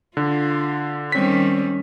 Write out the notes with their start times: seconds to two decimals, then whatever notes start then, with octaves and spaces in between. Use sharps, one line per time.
0.17 D3 F4
1.12 D#3 G3 C4 C#4 B6